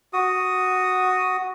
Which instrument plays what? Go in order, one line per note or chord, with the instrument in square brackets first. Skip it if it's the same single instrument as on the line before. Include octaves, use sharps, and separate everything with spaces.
[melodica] F#4 D#6